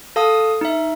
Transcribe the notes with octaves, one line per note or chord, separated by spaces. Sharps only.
A4 F5 A5 D#6
D#4 E5